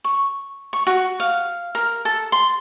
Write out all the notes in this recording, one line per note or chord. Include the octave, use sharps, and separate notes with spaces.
C#6
C#6
F#4
F5
A#4
A4
C6